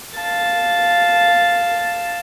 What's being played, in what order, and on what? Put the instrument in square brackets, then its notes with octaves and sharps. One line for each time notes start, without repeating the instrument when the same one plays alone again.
[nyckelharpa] F5 A5